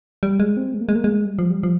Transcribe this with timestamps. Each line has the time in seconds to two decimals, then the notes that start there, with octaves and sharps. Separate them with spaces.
0.23 G3
0.40 G#3
0.57 C4
0.74 G#3
0.81 A#3
0.89 G#3
0.96 A#3
1.04 G#3
1.25 G3
1.39 F3
1.50 G3
1.63 F3